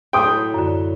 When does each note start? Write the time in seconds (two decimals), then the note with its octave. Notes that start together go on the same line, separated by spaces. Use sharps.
0.13 A2 F#3 G5 C6 D#6
0.54 F#2 D3